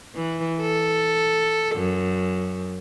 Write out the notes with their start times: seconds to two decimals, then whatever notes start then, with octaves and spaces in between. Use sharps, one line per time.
0.15 E3
0.61 A4
1.76 F#2